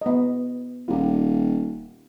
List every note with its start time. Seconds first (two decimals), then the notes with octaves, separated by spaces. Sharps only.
0.01 B3 D#5
0.88 D#1 F4 G4